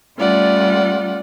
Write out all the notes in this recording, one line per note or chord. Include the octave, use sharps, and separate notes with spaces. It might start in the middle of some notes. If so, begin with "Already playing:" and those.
G3 A3 C#4 F4 D5 F#5